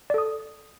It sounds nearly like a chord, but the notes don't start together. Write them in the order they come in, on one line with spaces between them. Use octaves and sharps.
D5 A4 D#6